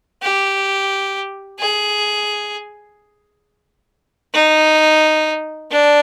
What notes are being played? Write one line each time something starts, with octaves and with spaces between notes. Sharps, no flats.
G4
G#4
D#4
D4